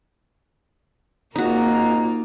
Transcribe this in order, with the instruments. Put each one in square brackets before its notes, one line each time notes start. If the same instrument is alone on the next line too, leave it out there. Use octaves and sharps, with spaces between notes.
[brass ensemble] G#1 G#2 A#5 [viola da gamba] A#3 F4 [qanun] D#4 F#4